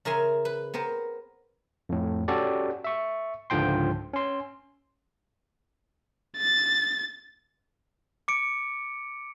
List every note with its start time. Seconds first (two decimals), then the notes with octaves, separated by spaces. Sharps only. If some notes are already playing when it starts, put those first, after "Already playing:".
0.05 C#3 A#4 E5 G#5 C6
0.45 B4
0.74 B3 C4 A#4 C5
1.89 F2 A2
2.28 C#4 F#4 G4 A4 D5
2.84 E5 C#6
3.50 C#2 G#2 D3 F3 G5 C6
4.14 C#4 C6
6.37 A6
8.28 D6 C#7 D7